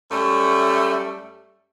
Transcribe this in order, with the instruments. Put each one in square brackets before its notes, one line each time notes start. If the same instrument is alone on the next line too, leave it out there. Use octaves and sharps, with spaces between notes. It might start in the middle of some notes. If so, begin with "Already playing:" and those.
[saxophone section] F#2 G3 A3